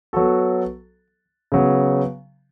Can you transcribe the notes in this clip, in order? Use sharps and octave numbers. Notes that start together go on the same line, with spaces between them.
F#3 B3 F#4 A4
C#3 F#3 B3